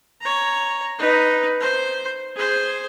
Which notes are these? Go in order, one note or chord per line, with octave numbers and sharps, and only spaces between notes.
C#5 A#5
D#4 B4
C5
G#4 C5